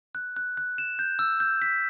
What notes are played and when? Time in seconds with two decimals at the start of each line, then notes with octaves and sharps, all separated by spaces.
0.15 F#6
0.37 F#6
0.57 F#6
0.78 E7
0.99 G6
1.19 E6
1.40 G6
1.62 B6